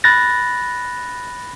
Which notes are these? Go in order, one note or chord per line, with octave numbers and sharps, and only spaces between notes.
B5 F#6 A6 A#6